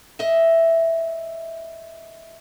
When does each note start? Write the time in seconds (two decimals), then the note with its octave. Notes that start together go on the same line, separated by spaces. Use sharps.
0.19 D#5 E5